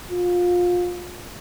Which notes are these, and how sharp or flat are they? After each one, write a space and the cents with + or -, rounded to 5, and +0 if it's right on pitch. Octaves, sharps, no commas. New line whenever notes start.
F4 +25